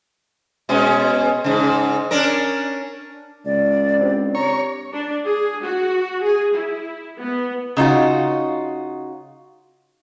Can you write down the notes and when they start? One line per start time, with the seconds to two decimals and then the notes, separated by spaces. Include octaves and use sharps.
0.69 B2 G#3 C#4
1.44 G#2 C#3
2.11 C#4 D4 A#4
3.09 D4
3.45 C#2 D5
3.99 C4 D4 G4
4.35 C#5 A#5
4.93 D4
5.25 G#4
5.63 F#4
6.24 G#4
6.55 E4
7.19 B3
7.77 C#3 D#4 F4 F#4